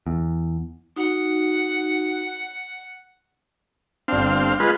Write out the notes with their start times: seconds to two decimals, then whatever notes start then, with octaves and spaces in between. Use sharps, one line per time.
0.07 E2
0.96 D#4 F#4 F#5
4.08 G1 C4 D4 F5
4.60 G#3 F4 B4